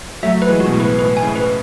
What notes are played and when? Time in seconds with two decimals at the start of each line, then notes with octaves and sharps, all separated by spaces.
0.23 F#3 A3 E5
0.42 B4
0.48 E3 G#3
0.60 F#4
0.66 B2
0.73 A2
0.80 B4
0.98 A2 B4
1.17 G#5
1.23 A2 C#3
1.36 B4